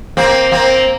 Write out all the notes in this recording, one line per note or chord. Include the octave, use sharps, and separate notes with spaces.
A#3 C4
A#3 C4